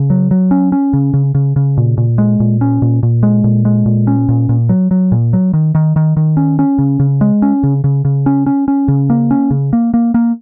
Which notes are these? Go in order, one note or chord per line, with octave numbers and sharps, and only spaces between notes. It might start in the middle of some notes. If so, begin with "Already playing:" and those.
Already playing: C#3
F#3
F#3
C#4
C#4
C#3
C#3
C#3
C#3
A#2
A#2
G#3
A#2
C#4
A#2
A#2
G#3
A#2
G#3
A#2
C#4
A#2
A#2
F#3
F#3
A#2
F#3
D#3
D#3
D#3
D#3
C#4
C#4
C#3
C#3
G#3
C#4
C#3
C#3
C#3
C#4
C#4
C#4
C#3
A#3
C#4
C#3
A#3
A#3
A#3